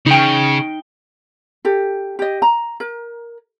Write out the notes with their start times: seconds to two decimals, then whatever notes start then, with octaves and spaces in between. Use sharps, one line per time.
0.06 C#3 D#4 G5
1.65 G4 A4
2.19 G4 D#5
2.42 A#5
2.80 A#4